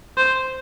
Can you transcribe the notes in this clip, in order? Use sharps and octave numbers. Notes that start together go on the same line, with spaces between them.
C5